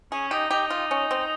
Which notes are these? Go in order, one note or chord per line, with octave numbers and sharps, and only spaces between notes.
C#4 G#4
D#4 G4
D#4 G4
F4
C#4
C4